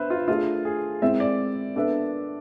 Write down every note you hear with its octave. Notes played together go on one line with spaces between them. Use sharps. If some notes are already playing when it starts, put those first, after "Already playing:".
Already playing: B3 D4 B4 C5 E5
F4
A3 D4 F4 G#4
G#4
G#3 C4 E4 E5
D5
B3 D4 A4 E5